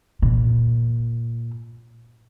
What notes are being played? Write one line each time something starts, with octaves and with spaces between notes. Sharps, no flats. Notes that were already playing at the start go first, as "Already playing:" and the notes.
A#2